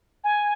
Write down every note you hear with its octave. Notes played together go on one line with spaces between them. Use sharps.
G#5